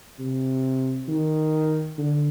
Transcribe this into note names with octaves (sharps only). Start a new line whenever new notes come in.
C3
D#3
D3